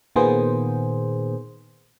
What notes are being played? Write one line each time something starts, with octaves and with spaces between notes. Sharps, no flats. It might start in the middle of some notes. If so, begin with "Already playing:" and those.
A#2 D#3 A#3 B3 G#4 C5